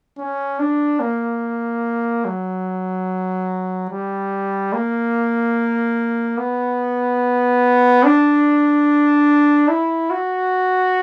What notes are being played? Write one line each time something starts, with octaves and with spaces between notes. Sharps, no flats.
C#4
D4
A#3
F#3
G3
A#3
B3
D4
E4
F#4